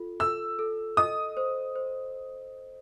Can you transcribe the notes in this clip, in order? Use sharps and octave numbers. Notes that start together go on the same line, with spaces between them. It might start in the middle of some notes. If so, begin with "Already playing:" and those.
Already playing: F4 A4
A4 E6
A4
D#5 D#6
C5
C5